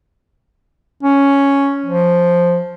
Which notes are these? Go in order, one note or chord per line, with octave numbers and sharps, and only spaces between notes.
C#4
F3